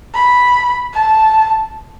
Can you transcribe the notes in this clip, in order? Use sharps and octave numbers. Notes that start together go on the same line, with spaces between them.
B5
A5